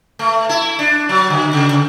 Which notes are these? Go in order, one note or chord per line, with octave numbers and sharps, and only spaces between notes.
A3
E4
D4
F#3
D3
C#3
C#3